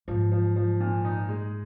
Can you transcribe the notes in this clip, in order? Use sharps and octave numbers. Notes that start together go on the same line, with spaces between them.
G#2 F3
F3
F3
A#2
D#4
G#3